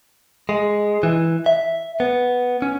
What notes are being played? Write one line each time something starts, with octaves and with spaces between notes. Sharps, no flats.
G#3
E3
E5
B3
C#4